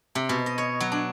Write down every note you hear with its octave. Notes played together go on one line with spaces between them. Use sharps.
C3
B2
D#5
C#5
F#3
D4